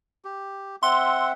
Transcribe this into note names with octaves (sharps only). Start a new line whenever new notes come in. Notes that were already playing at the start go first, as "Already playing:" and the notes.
G4
C4 E5 F#5 C6